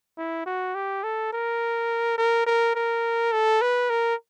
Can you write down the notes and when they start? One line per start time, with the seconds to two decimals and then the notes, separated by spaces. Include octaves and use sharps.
0.18 E4
0.46 F#4
0.75 G4
1.03 A4
1.32 A#4
2.18 A#4
2.46 A#4
2.75 A#4
3.32 A4
3.61 B4
3.90 A#4